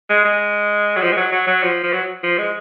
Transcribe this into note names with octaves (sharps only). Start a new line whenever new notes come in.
G#3
G#3
F#3
F3
G#3
F#3
F#3
F#3
F3
F3
F#3
F3
G#3